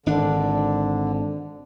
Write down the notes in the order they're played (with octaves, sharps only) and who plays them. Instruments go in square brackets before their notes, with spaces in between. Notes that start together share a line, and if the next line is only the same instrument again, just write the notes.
[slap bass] G#1 D4 [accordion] D3